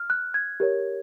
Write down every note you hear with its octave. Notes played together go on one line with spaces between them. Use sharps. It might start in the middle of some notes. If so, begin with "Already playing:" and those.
Already playing: F6
F#6
G#6
G4 A#4 C#5